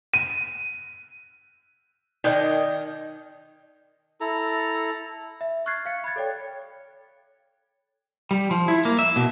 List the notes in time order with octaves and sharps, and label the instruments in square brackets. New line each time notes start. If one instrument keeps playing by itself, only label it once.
[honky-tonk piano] D#7
[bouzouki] D#3 B4 D#5 [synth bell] D#4 D5 G5
[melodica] E4 A4 A#5
[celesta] E5
C#6 F6 F#6 G#6 A6 C7
F5 C#7
B5 F#6 G#6 A6
A4 C#5 D5 G5
[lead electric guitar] G3
F3
E4
A#3
E5
B2